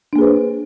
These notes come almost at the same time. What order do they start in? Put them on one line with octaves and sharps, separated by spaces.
D4 A#3 G#4 B4 C5